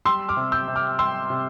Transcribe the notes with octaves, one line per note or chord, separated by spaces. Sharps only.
G3 C6 E6
D6 F6
C3
E6 G6
C3
D6 F6
G3 C6 E6
C3